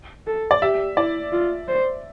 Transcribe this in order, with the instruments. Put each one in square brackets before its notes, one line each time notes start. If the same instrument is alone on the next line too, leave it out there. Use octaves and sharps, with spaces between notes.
[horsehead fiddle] A4
[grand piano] D5
[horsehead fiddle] G4 [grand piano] E5
[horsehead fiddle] E4 [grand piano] D5
[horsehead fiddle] F4
C5